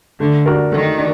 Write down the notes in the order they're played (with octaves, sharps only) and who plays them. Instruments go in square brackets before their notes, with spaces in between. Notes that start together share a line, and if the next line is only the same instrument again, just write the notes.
[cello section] D3 [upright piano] A3
[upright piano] D4 F#4 A#4
[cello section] D#3 [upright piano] A3
[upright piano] D4